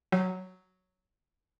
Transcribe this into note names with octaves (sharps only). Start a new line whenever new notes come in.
F#3